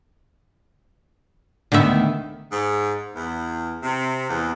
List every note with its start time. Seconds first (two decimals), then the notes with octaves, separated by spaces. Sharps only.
1.72 D2 D3 D#3 B3 E5
2.52 G#2
3.15 E2
3.83 C3
4.30 E2